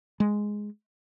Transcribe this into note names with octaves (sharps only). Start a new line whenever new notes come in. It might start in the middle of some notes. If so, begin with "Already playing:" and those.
G#3